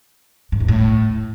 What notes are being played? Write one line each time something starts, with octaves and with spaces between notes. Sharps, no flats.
G#2
E2
A2